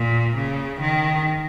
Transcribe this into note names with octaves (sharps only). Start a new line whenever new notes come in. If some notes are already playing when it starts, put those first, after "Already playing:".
Already playing: A#2
C#3
D#3